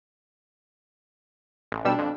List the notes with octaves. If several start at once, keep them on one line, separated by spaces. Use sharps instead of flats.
A1
B1 G3 D4 E6
F2